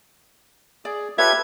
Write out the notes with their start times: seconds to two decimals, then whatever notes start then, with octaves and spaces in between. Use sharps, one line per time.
0.85 G#4 D5
1.18 F4 G4 A4 B4 C#5 E5 G#6